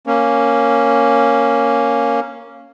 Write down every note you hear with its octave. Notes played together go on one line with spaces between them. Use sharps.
A#3 C#4